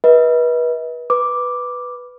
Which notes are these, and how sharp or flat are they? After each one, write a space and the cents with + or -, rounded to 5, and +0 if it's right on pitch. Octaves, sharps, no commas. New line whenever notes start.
B4 -30 D#5 +45
B4 +0 D6 +0